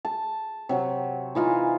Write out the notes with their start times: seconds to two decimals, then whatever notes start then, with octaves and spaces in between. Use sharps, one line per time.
0.05 A5
0.69 C3 F#3
1.35 E3 D#4 F4 G#5